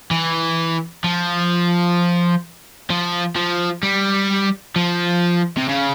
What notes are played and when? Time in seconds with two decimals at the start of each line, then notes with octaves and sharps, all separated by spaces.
0.11 E3
1.04 F3
2.90 F3
3.36 F3
3.83 G3
4.76 F3
5.57 C3
5.69 C#3